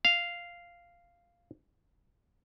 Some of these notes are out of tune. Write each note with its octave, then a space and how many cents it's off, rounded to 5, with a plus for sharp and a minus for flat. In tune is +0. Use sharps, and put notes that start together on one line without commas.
F5 -5